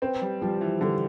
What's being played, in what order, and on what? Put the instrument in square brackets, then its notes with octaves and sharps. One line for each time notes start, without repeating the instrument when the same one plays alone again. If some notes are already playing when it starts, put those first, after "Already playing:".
[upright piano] C4 [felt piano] B4
[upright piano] G3
[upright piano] F3 [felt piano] G3
[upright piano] E3
[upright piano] D3 [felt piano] G3